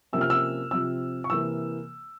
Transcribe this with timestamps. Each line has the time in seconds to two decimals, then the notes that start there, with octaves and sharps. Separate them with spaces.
0.13 C3 F3 A#3 C#4 E6
0.21 F6
0.30 E6
0.71 C3 F3 C4 E6
1.24 C#6
1.30 C3 E3 A#3 E6